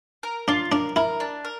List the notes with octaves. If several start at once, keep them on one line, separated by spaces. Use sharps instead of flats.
A#4
D4 F4
D4 A#4
E4 A#4
D4
A#4